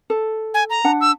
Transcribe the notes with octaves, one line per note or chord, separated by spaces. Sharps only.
A4
G#5
A#5
D4 F#5
E6